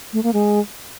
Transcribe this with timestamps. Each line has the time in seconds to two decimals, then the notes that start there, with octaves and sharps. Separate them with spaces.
0.13 A3
0.23 A#3
0.33 G#3